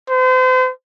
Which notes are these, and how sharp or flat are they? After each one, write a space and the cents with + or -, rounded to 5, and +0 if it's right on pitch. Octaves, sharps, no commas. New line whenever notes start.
C5 -40